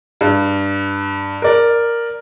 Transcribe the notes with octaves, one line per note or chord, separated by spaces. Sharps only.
G2
A#4 D5